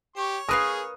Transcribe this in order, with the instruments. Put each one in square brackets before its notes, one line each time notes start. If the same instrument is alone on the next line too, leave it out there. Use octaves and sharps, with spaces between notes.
[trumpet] G4 [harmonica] C#5 C#6
[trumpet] G#4 [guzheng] A#4 B4 F5 [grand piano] D#6